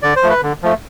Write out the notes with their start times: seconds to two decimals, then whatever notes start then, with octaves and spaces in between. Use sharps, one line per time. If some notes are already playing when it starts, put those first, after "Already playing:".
0.03 D3 D5
0.16 C5
0.23 F3 A3
0.29 B4
0.43 D3
0.63 F3 A3